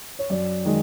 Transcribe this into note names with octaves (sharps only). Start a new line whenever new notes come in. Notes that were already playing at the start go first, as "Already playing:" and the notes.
C#5
F#2 D5
D#3 G#3